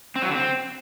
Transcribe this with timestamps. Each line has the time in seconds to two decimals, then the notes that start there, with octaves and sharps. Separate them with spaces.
0.16 C4
0.22 F#3
0.29 D3
0.36 C4